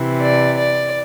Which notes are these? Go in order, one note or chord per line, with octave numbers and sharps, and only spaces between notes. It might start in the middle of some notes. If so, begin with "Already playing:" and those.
Already playing: C3 E3
D5
D5